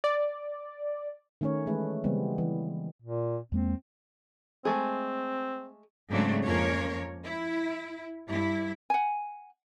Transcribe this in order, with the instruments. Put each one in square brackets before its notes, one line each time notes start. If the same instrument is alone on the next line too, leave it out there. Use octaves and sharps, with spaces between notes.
[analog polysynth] D5
[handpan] D#3 A3 C#4 A#4 C#5
E3 G#3 A3 G#4 B4
C#3 E3 G3 G#3 B3 C4
E3
[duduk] A#2
[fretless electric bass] E2 G#3 A#3 [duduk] C4
[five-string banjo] G#3 A3 G#4 [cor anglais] C4
[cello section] G#2 C#3 F#3 A3 C4 D4
F2 F3 A#3 C#4 A#4 C#5
E4
G2 E4
[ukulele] F#5 G#5